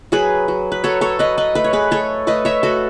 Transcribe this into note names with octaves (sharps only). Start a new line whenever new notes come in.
F#3 G#4 B4
F#3
B4
F#3 A4 C#5
A4 C#5
F#3 B4 D#5
B4 D#5
A3 B4
C#5
G#4 B4
A3 A4 C#5
A3 B4 D#5
C#5 E5
A3 F#4 A4